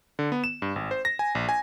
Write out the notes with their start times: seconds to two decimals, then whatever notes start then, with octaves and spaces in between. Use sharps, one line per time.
0.19 D3
0.32 B3
0.44 E7
0.62 G2
0.76 G#1
0.91 C5
1.05 A#6
1.19 G#5
1.35 A#1
1.49 G#5